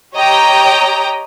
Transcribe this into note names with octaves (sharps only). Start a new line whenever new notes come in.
G4 C#5 D#5 G5 A#5